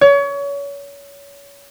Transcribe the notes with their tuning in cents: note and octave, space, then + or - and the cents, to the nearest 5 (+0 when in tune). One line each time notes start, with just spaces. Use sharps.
C#5 +30